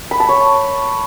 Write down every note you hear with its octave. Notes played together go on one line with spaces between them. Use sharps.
B5
A5
C#5